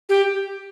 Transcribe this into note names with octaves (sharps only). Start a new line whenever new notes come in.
G4